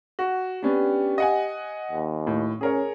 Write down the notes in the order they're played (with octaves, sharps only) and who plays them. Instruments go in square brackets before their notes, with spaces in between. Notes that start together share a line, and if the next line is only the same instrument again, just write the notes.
[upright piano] F#4
[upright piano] B3 C#4 D4 [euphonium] G4
[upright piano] D#5 F#5 G#5
[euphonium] D#2
[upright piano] A2
[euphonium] C#4 [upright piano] G#4 A#4 C#5